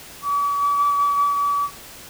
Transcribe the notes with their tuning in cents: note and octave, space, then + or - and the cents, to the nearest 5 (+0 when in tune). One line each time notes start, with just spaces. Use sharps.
D6 -45